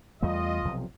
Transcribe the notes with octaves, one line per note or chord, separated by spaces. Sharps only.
E2 G3 A3 F4 D#5
B1 C3 F3